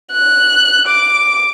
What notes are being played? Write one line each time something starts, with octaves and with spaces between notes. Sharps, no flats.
F#6
D6